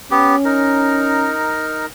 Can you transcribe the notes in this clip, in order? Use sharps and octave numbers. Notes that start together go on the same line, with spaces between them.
B3 C#4 G4
D#4 A#4